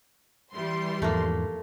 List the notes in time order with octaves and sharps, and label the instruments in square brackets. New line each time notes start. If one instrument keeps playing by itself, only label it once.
[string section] E3 G3 C6
[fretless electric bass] E2 G#2 F3 [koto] A3 A#3